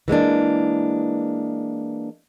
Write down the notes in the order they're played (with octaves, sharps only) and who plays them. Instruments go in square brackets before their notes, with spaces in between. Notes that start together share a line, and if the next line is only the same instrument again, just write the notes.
[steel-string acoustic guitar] E3 G#3 A#3 D4